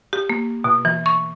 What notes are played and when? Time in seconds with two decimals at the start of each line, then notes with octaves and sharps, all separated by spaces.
0.13 G4
0.30 A#3
0.64 B2
0.85 E3
1.06 C#6